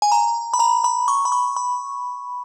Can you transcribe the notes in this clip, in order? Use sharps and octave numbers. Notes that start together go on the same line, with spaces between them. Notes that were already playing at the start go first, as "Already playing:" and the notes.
G#5
A#5
B5
A#5
B5
C#6
B5
C#6
B5